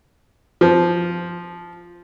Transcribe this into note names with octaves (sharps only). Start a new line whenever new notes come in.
F3